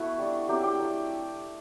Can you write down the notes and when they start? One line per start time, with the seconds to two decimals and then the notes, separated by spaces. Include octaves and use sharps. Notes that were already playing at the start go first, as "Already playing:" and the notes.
Already playing: A3 B3 E4 F#4 A4
0.18 G3 D4
0.48 F#3 A3 C4 G4 G5
0.63 G4 G5
0.79 F#3 A3 D4